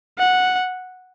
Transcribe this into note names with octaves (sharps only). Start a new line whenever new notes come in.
F#5